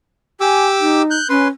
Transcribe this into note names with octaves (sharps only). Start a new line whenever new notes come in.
G4 G#5 D6 E6
D#4
F#6 G6
C#4 B4 C6